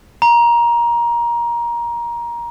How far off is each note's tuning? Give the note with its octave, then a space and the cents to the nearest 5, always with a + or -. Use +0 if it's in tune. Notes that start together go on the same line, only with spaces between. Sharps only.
A#5 +20